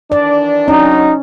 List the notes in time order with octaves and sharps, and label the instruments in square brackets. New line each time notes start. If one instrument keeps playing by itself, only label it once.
[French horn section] D#3 E3 D4 [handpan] D5
[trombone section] F#3 D#4 [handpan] C#4